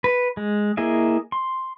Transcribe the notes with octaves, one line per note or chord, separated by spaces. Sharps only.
B4
G#3
A#3 E4 G#4 D#5 E5
C6